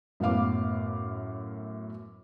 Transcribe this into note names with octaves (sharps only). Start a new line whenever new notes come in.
F#2 A2 B3 F5 D6